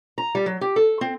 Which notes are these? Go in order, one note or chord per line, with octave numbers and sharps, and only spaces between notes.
A#5
G3
F#3
G4
A4
C4